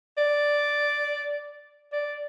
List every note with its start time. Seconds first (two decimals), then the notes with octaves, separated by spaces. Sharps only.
0.17 D5
1.92 D5